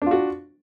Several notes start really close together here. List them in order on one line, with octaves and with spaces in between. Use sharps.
D4 F4 F#4